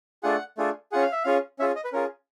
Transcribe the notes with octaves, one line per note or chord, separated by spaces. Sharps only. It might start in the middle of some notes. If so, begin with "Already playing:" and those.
A3 D4 F4 G#4 F#5
A3 D4 F4 G#4
C#4 F4 G#4 F#5
F5
E5
C#4 F4 G#4 F5
C#4 F4 G#4 E5
D#5
B4
C#4 F4 G#4 A#4